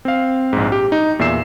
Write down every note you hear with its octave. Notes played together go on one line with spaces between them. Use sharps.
C4 F5
A#1 G#2
G4
D#4
E2 A#2 E5 E6 C7 E7